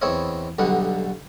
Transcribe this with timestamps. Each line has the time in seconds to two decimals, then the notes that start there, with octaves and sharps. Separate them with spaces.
0.02 E2 C4 E4 C#5 D#5
0.59 B1 D3 G3 D#5 F#5